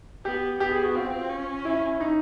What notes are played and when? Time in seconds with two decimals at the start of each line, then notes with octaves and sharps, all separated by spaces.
0.25 B3 G4
0.60 B3 G4
0.71 G#4
0.84 F#4
0.95 C4 F4
1.29 C#4
1.65 E4
2.00 D#4